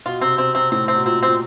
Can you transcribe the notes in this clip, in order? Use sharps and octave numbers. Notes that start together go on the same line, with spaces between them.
B2 F4
C3 C4
C3 C4
C3 C4
A2 C4
C4
B2
A#2 C4
A#2 C4